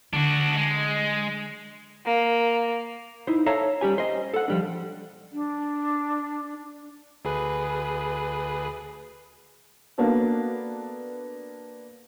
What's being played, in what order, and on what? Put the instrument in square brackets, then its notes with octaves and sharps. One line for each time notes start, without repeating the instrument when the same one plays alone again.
[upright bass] D3 [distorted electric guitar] D4 F#4
[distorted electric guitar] G#3
[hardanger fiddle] A#3
[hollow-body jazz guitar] D#4 E4 C5
A4 C#5 E5 F5 A5 A#5
G3 C#4 G4 G#5
C5 D#5
A4 F#5
F3 G3 D4
[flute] D4
[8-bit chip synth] D2 G#4 B4
[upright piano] A#3 B3 D4 F#4 A4